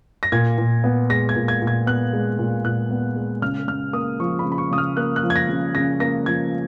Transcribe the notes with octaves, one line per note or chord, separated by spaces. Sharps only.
A#6
A#2 G#6
A#2
B3
G#3 A#6
G#6
A#2
G#6
A#2
G#6
B3 F#6
G#3
A#2
A#2 F#6
B3
G#3
C#3 F6
C#3 F6
A#3 D#6
F3 C#6
B5
C#3
B5
C#6
C#3 D#6
F6
A#3 F#6
F#6
F3
G#6
A#6
C#3
C#3 A#6
A#3 A#6
F3 G#6